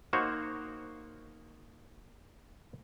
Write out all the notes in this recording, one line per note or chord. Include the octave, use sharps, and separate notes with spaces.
A#3 D#4 F#4 C5 C#5